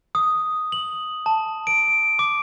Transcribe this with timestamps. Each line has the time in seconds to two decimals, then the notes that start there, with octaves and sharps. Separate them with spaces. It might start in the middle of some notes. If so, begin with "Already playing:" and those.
0.15 D#6
0.72 F#7
1.26 A5
1.67 D7
2.19 D6